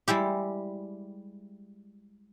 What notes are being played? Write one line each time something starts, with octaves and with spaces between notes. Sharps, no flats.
G3 G#3 E4 G4